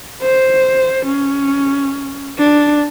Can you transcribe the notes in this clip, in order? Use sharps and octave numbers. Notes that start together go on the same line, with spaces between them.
C5
C#4
D4